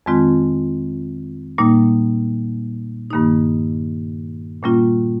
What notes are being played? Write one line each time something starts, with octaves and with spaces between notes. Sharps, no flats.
F2 D#3 G#3 C4 F4
A#2 G3 A#3 D#4
G2 D#3 A#3 D#4
A#2 G3 A#3 C#4 F4